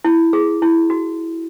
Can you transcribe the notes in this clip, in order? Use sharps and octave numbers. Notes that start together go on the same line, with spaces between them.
E4
G#4
E4
F#4